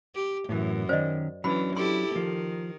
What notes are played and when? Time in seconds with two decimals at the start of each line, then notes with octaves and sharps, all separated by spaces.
0.15 G4
0.49 F#2 A2 E3
0.89 D#3 C#4 C5 D5 D#5
1.44 E3 F#3 C#4 D4 B5
1.76 E4 G4 A4 C6
2.16 D#3 F3